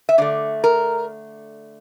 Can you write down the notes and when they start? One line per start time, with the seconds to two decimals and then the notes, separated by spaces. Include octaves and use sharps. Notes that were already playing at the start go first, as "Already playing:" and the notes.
0.09 E5
0.18 D3 A3 D5
0.64 A#4